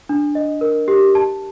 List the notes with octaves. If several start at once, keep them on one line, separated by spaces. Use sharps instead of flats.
D4
D#5
A#4
G4
A5